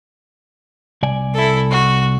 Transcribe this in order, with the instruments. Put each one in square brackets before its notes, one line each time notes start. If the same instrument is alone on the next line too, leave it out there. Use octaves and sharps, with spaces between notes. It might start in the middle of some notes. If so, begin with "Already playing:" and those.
[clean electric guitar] C2 D5 G#5
[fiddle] E4 A4
F#4